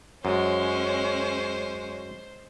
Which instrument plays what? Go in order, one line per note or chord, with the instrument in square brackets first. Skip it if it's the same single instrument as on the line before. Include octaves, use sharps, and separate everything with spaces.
[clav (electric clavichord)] F#2 [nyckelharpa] G#3 [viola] C#4 [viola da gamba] C5